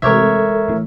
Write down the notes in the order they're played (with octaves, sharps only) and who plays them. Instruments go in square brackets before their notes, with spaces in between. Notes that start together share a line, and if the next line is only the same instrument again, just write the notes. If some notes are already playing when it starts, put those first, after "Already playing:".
[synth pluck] A1 C3 [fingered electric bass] E3 G#3 [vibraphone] A4 [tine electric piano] A#4 C#5 E5
[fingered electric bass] A1 E3 A3